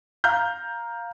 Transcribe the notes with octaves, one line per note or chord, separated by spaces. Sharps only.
F5 A#5 F6 G6